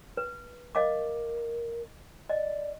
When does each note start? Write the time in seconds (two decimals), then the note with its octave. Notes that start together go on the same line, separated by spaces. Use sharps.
0.17 B4
0.75 A#4 D#5 F5 D6
2.29 D5 D#5